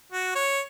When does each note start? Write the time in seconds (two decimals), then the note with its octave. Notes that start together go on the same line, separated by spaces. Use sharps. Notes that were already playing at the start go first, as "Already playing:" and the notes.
0.12 F#4
0.35 C#5